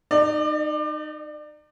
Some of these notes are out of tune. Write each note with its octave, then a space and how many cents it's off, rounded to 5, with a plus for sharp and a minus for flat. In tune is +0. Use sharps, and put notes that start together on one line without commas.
D#4 -25 D5 +30